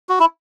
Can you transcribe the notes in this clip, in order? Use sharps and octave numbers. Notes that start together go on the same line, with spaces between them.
F#4
E4